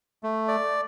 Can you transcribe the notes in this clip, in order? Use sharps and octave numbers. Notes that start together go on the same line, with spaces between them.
A3
D5